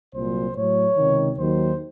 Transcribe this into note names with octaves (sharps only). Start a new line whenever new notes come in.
C2 A#2 F#3 C5
A2 F#3 C#5
C#2 C3 D#3
D#2 D#3 F#3 C5